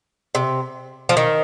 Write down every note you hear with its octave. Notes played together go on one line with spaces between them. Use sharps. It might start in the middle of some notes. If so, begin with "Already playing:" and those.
C3
F3
D#3